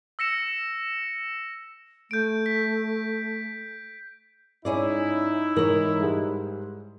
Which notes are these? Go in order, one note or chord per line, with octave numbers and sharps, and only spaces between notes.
E6 A#6 C#7 E7
A3 G6 D7
B6
G#2 C#4 D#4 E4 G#4 D5
G#2 E3 A#4 C#5 F#7
G#2 G3 G#3